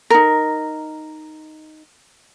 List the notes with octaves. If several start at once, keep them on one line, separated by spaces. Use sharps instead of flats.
D#4 A#4